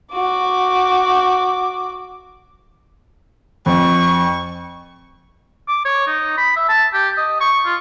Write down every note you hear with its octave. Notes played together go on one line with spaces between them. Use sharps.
F#4 D6
F2 C#6
D6
C#5
D#4
B5
E5
A5
G4
D#5
C#6
F4